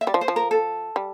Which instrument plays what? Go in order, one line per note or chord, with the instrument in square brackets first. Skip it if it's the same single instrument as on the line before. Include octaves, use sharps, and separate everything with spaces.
[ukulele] E5
[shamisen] G3 [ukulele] D5
[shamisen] F3
[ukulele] C5
[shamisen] F3
[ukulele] A#4
A4
[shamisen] G3